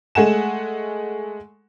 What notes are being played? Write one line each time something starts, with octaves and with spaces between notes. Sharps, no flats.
G#3 A3 F#5 G#5 E7